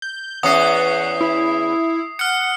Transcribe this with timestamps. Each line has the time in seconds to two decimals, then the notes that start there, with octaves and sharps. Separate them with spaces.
0.02 G6
0.43 E2 C#4 F#5 D#6 C7
1.21 E4
2.19 F#5 F6 C#7